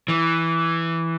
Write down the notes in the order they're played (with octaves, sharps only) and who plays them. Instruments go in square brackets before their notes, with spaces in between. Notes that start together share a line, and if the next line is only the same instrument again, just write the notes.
[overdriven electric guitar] E3